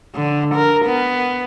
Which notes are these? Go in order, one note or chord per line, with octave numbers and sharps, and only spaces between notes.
D3
A#4
B3